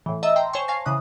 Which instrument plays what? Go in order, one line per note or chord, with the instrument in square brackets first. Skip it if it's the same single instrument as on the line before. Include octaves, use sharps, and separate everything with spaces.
[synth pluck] A2 E3
D#5 E5 A5 A#5 E6
G5 A#5 C6
C5 C#5 G#5 A5 C6 C#6
F5 G#5 A5 C#6 A#6 C7
C#3 E3 D#6 F#6